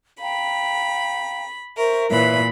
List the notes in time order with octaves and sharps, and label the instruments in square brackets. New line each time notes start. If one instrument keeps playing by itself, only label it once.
[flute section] F5 G5 A#5 [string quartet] B5
[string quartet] A#4 [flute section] C5 E5 C#6
[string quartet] A#2 E3 B5 [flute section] B4 C#5 E5